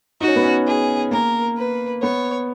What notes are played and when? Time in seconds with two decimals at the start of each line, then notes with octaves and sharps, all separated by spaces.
0.21 D#4 F#4
0.28 C#4
0.36 B3
0.44 C#4
0.67 G#4
1.11 A#3 A#4
1.57 B4
2.02 B3 C#5